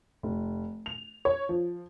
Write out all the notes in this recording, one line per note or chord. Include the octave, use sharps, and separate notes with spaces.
F1
F7
C#5
F3